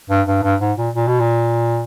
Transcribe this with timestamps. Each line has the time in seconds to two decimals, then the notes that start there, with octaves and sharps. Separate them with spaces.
0.10 G2
0.27 G2
0.43 G2
0.61 G#2
0.78 A#2
0.95 A#2
1.07 B2
1.20 A#2